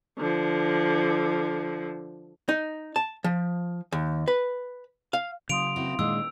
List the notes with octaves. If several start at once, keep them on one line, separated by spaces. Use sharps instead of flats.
D3 F3
D#4
A5
F3
D#2
B4
F5
C#3 F#3 F5 C6 D#6 D7 F7
C4 E4 F#4
A#2 D#3 G#3 D4 E6